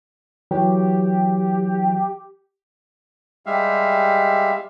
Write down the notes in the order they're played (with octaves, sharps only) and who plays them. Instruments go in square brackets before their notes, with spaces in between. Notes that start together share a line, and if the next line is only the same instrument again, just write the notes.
[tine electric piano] E3 F#3 [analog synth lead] G4
[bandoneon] G3 G#3 G4 E5 F5